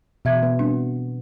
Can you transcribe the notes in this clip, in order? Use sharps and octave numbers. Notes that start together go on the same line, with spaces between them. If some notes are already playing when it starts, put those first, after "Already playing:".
B2 E3 E5 G#6
B3
G3 C4 D4